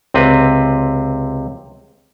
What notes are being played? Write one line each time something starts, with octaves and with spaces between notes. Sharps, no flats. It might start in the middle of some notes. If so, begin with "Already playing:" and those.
C#2 C3 C4 B4